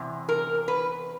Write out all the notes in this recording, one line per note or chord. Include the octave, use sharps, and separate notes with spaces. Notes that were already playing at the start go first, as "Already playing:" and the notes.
Already playing: E2 C3
A#4
B4